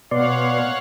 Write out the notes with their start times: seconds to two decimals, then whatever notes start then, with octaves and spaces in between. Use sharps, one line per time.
0.11 B2 B3 C#5 D5 F5 F#5 C6